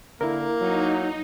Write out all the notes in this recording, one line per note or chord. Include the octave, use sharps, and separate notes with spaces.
D3 A#3 E4 A#4
F#3 D#4